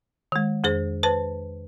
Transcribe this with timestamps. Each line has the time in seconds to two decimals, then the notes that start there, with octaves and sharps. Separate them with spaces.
0.32 D#3 G#3
0.64 F2 G#4 C5
1.03 B4 C5 A5